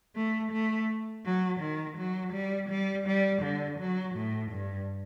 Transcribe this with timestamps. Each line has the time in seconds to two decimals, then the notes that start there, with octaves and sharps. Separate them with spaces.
0.16 A3
0.52 A3
1.25 F#3
1.61 D#3
1.98 F#3
2.33 G3
2.70 G3
3.06 G3
3.42 D3
3.79 F#3
4.16 A2
4.52 G2